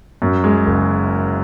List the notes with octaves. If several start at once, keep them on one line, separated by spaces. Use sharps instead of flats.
F#2
G#3
F#1